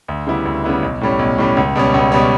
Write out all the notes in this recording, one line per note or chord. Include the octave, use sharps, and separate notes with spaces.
D2
C#3 G3 B3 E4
D2
C#3 G3 B3 E4
B1
A2 G3 C#4
B1
A2 G3 C#4
C#2
B2 G3 C#4
C#2
B2 G3 C#4